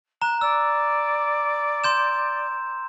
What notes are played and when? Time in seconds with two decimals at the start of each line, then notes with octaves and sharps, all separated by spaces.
0.22 A#5 F#6 E7
0.41 D5 E6
1.84 C6 G6 E7